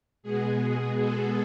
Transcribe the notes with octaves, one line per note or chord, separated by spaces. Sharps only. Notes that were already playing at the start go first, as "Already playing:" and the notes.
B2 G#3 B3 G#4
A4